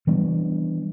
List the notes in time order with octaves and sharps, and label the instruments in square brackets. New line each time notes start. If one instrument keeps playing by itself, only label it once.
[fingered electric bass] E3 G3 B3 D4